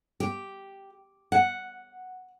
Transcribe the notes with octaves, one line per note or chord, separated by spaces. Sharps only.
G4
F#5